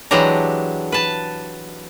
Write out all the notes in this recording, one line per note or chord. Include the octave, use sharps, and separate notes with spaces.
E3 F#3 G#3 D4 G4 A#5
B4 A5